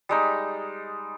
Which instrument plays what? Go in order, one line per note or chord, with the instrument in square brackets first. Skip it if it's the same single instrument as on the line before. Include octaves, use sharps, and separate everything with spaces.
[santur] G3 G#3 D#4